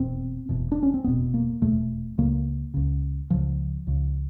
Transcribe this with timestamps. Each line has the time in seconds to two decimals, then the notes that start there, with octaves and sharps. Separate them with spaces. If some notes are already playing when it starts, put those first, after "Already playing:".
Already playing: F1 E2 B2 C4
0.49 F1 E2 B2
0.72 D4
0.83 C#4
0.94 C4
1.04 F1 E2 B2 B3
1.34 A#3
1.62 F1 E2 B2 A3
2.18 C#2 C#3 A#3
2.74 C#2 C#3
3.30 C#2 C#3 F3
3.87 C#2 C#3